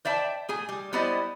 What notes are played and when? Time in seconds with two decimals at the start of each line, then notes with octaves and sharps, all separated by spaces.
0.05 C5 D5 E5 G5 A5
0.49 A3 G#4 G#5
0.69 G3
0.93 G3 B3 E4 C5 D5 D#5